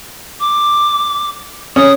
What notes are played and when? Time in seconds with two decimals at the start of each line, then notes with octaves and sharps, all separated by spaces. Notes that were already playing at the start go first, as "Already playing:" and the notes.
0.40 D6
1.76 C#4 D#6